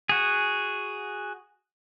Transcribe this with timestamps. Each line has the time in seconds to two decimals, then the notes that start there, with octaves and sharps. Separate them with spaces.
0.09 F#4 G#4